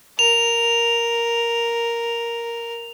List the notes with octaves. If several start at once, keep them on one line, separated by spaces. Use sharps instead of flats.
A#4 F7